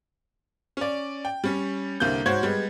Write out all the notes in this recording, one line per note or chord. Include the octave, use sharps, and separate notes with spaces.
C#4 D5
G5
G3 C#4
C2 D3 G3 A#3 G6
G#2 F#4 C5 C#5 G#6
G3 G#3 B3